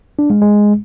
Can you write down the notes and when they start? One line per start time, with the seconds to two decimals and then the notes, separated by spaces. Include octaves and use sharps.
0.19 D4
0.30 G#3
0.41 G#3